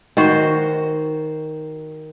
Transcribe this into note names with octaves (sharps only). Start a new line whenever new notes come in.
D#3 F#4 C5